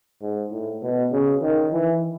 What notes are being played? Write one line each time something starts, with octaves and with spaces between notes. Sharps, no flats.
G#2
A2
B2
C#3
D#3
E3